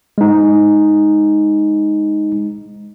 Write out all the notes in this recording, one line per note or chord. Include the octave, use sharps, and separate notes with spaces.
G#3 D#4